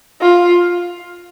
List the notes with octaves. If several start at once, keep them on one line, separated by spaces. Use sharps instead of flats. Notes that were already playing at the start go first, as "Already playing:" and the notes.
F4